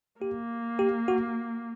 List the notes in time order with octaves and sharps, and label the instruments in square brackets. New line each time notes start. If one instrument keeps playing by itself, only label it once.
[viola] A#3 [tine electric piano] G4
[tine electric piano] G4
F#4